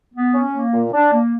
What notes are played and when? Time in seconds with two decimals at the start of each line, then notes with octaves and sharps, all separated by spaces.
0.15 B3
0.34 C#4
0.54 A#3
0.73 A#2
0.92 D4
1.12 A#3